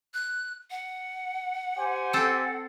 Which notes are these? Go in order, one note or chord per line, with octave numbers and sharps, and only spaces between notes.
F#6
F#5
G4 C5 G#5
C4 A4